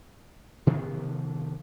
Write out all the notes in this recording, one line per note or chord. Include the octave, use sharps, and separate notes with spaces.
C3 D#3 F3 B3